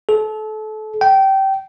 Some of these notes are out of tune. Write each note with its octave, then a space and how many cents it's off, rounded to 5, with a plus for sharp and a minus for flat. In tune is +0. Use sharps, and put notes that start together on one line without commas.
A4 -30
G5 -20